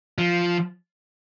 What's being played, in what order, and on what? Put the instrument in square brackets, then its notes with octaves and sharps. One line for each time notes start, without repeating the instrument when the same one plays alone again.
[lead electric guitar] F3